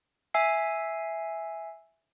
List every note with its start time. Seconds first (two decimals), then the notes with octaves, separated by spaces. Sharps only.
0.34 E5 G#5 E6 C7